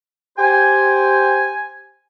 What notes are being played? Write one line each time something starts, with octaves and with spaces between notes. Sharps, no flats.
G4 C5 G#5